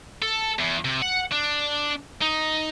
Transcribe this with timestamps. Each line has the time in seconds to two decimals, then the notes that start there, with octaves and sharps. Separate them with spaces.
0.22 A4
0.59 E2
0.85 C3
1.02 F#5
1.32 D4
2.22 D#4